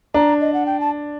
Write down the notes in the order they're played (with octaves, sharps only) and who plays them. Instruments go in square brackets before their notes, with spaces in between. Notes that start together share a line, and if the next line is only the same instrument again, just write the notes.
[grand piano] D4 [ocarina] A#5
[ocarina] D#5
F#5
G5
A5